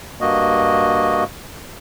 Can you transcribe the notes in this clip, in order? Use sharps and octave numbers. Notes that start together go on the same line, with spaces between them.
G2 A#3 F#4 D#5